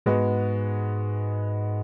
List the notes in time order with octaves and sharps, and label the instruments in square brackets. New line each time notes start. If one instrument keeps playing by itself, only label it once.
[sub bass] G#2 [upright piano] G#3 B3 F#4